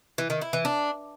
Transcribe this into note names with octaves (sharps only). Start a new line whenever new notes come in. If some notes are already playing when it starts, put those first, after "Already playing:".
E3
D#3
E4
E3
D4